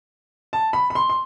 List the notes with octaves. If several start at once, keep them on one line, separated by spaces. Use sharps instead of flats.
A5
B5
B5
C6
C6